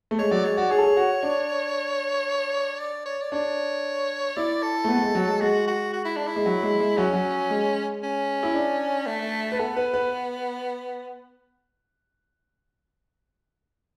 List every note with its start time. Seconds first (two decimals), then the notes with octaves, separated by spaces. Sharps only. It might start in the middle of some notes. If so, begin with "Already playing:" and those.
0.11 A3
0.19 G#3 C#5
0.31 F#3 D5
0.44 G#3 C#5
0.57 F#4 D5
0.70 G#4 C#5
0.79 A4
0.83 G#4
0.97 F#4
1.23 D4
2.79 D5
3.06 C#5
3.22 D5
3.32 D4 C#5
4.37 E4 D5
4.62 A4
4.84 A3
4.88 B3
4.96 A3
5.02 G#3
5.15 F#3
5.28 G#3
5.41 G#3 F#4
5.67 F#4
5.93 F#4
6.05 E4
6.16 D4
6.27 E4
6.36 G#3
6.46 F#3
6.63 G#3
6.80 G#3
6.97 F#3 C#4
7.13 F#3
7.50 G#3
8.03 C#4
8.43 E4
8.54 D4
9.06 A3
9.52 B4
9.59 B3 A4
9.76 B4
9.94 B4